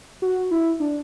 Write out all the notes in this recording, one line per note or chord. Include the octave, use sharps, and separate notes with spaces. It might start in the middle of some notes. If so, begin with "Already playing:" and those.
F#4
E4
D4